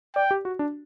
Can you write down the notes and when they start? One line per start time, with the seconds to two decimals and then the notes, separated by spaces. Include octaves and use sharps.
0.16 D5 G5
0.31 G4
0.45 F#4
0.59 D4